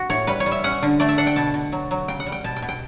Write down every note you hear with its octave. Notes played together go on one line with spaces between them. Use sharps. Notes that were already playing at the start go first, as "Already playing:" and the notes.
Already playing: F#4
A2 C#5
G3 B4
C#5
G3
E5
C#4 F#5
D3
A3 D5
E5
D4 F#5
G5
B2 A5
B2
F#3
F#3
C#3 G5
F#5
G3
G5
B2 A5
G5
B2
G5